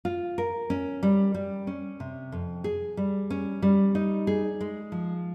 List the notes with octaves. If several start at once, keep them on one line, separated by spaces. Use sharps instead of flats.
F4
A#4
C#4
G3
G3
C#4
C3
F2
G#4
G3
C#4
G3
D#4
G#4
G#3
F3